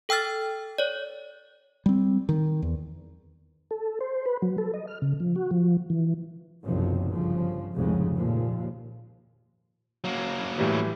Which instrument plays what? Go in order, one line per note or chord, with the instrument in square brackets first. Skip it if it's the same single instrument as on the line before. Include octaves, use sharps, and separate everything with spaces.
[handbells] A4 G5 E6 F6 A6
C#5 D5
[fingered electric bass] G3 C4
D#3
E2
[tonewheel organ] A4
C5
B4
F#3
A4
D#5
F6
C#3
F3
F#4
F3
E3
[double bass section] F#1 B1 C3 D#3 F3 F#3
G1 C#3 F3
F1 C2 F2 G#2 C#3 G#3
D#2 A#2 F3
[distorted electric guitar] F#3 A#3
[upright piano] A2 E3 G3